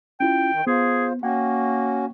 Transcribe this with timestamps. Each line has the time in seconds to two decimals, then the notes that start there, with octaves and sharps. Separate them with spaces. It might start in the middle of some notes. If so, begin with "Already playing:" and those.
0.20 C#4 E4 F4 G5
0.53 D#3
0.67 B3 F4 G#4 C5
1.23 A#3 C#4 F#4 F#5 G5